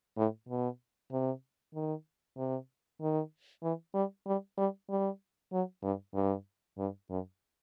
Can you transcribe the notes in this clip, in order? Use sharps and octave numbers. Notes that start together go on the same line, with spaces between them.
A2
B2
C3
D#3
C3
D#3
E3
G3
G3
G3
G3
F#3
G2
G2
G2
F#2